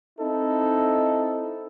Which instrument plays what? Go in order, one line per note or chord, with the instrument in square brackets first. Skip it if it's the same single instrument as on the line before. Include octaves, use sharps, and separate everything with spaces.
[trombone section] C4 D#4 E4 A4